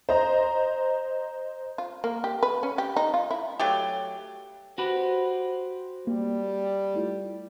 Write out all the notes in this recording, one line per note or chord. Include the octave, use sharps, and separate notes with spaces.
C5 D#5 A#5
F4
A#3
G4
B4
C#4
G4
D#4
F4
E4
F#3 A3 G4
F#4 G4 B4 C5 A#6 E7
G3 A#3
A3 E4 F4